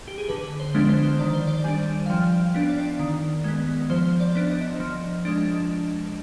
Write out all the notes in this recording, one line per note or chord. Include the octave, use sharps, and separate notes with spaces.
G4
G#4
D3 B4
C5
F3 G#3 B3 D4
C5
D#3 D5
C5
D5
G3 D4 G#5
F5
F3 G5
F5
B3 D4
D5
D#3
G#3 B3
F3 C5
D5
B3 D4
D#5
F3
G#3 D4